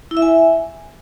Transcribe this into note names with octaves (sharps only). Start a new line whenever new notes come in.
E4
E5
G#5